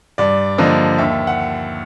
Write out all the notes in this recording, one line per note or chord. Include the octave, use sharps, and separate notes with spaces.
G2 D5
D3 F3 A#3 D#5
D#2 E5
F#5